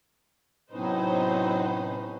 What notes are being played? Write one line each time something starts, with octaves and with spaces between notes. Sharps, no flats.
A2 C3 F#3 B3 C#4 D#4 B4 C5